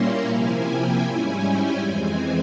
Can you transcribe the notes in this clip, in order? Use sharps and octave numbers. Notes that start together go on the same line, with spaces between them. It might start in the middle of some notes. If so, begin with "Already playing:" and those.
Already playing: A#2 G3 A#3 C#4 E4 A#5 C6
C3 F3 A#3 E4 G#5
G5
G#2 G3 C#4 E4 G#5
G5
F2 E3 G#3 C4 G#5